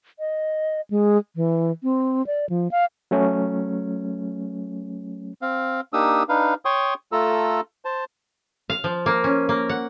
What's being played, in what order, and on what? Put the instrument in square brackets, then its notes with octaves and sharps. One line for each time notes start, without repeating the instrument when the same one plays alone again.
[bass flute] D#5
G#3
E3
C4
D5
F3
F5
[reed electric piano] F#3 A3 C#4
[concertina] C4 F5
A#3 D4 D#4 G4 D#6 E6
D4 D#4 B4 F5
C#5 G5 C6 C#6 D#6
A3 F4 A4 A#5 E6
C5 A5
[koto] F5
F3
A#3
C#4
A#3
F#5